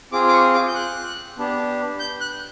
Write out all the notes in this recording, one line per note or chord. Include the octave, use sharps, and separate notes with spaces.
C4 F4 G#4 D6
D6
C#6
D6
G6
F#6
B3 D4 G4
G6
F#6